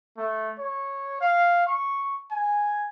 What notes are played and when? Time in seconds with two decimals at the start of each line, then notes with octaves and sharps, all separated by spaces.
0.18 A3
0.59 C#5
1.21 F5
1.67 C#6
2.31 G#5